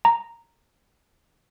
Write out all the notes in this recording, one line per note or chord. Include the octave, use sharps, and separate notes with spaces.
A#5